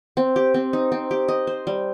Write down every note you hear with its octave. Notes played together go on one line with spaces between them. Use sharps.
C4
G4
C4
D#4
C4
G4
D#5
C5
G3